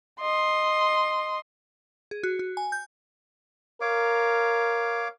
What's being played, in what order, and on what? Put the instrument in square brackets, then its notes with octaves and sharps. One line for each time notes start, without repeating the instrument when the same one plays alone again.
[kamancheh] D#5 C6
[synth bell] G#4
F#4
F#4
G#5
G6
[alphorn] A#4 [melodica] C#5 F5 D6